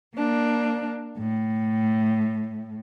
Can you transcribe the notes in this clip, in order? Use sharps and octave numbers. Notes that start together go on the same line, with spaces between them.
A#3 D4
A2